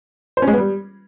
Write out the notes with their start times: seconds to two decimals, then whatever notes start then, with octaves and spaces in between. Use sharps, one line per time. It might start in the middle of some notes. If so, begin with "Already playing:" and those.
0.37 C5
0.42 C#4
0.47 G#3
0.53 B3
0.58 G3